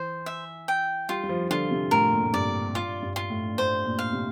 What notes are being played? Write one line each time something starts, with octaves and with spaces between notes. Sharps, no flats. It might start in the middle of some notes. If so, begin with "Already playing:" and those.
Already playing: E3 C5
E5
G5
G3 F4
G3
F3
D3 F4
C3
A2 A#4
A#2
A2
G2 D5
F4
G2
F4
A2
A2 C5
A#2
F5
C3